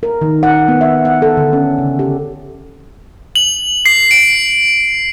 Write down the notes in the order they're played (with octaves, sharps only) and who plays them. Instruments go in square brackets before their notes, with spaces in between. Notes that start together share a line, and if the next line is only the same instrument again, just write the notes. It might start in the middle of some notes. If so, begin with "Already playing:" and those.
[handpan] A#4
D#3
F#5
B3
E5
F#5
A4
D3
C#4
C#3
G4
[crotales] F#7
C7
D7